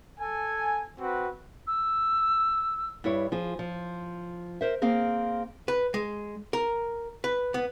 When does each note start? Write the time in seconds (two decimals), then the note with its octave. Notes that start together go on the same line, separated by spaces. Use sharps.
0.19 A4 G#5
1.00 C4 F#4 B4
1.67 E6
3.04 G2 E4 C#5
3.32 F3 F4 G#4
3.59 F3
4.61 A#4 C5 E5
4.82 A#3 C4 G#4 F5
5.68 B4
5.94 G#3
6.53 A#4
7.24 B4
7.54 B3